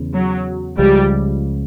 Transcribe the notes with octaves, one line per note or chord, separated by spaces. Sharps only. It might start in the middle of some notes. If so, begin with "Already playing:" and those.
Already playing: E2 C#3
F#3
C#2 C#3 F3 G3 G#3